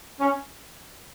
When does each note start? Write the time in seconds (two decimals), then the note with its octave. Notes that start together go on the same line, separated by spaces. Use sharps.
0.20 C#4